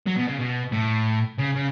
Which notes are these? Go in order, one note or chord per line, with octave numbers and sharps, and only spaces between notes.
F#3
B2
C#3
B2
A2
C#3
C#3